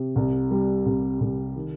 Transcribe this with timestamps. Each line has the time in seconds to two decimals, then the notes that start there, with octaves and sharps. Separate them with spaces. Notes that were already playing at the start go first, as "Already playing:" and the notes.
Already playing: C3
0.16 C2
0.51 G3
0.86 C2
1.21 C2
1.55 D#3